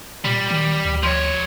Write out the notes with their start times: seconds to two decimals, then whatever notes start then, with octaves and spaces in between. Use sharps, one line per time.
0.24 A#2 G3
0.50 D#3
0.85 D2
1.03 F3 C#5